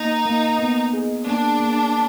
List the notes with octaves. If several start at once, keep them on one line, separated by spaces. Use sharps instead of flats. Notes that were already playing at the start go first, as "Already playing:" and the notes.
Already playing: A#3 D#4
A#3
B3
G#4
A#3 D4
A#3